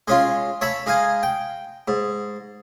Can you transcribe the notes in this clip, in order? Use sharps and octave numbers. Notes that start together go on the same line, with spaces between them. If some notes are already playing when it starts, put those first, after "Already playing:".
G#3 C#4 F4
C#5 E5 A5 B5
G#3 D#4 F5 G#5
G5
G#2